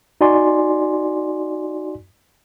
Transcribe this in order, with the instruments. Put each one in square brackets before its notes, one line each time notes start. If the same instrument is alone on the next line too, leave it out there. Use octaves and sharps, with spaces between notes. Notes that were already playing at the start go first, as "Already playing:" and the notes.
[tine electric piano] D#4 F#4 D5 G#5 C6